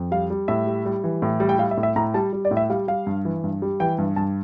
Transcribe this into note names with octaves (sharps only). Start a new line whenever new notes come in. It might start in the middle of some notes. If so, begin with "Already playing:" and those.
Already playing: F2
G3 F5
G3
A2 E5
G3
G3
E3
A2
G3
G5
G3 F5
E5
A2
E5
A2 A#5
G3 A5
G3
D5
A2
E5
G3 F5
G3 F5
G2
E3
G2
G3
E3 G5
G2
G2 A5